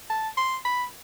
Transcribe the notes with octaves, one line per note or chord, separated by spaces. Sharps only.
A5
C6
B5